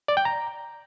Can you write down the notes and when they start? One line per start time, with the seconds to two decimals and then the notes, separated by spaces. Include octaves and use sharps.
0.08 D5
0.17 G5
0.25 A#5